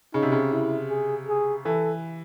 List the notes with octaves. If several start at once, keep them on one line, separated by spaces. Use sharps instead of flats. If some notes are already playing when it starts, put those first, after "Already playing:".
C#3 D#4
C3
C#3
E4
G#4
G#4
E3 A4